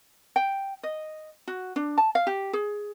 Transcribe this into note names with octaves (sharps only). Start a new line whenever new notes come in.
G5
D#5
F#4
D4
A5
F5
G4
G#4